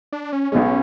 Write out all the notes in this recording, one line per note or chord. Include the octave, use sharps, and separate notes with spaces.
D4
C#4
B1 B2 G#3 C#4